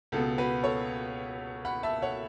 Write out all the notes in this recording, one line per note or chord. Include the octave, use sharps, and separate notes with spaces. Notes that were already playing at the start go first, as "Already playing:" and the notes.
C#2 B2 B3 A4
F#4 B4
A4 C#5
F#5 B5
E5 A5
C#5 F#5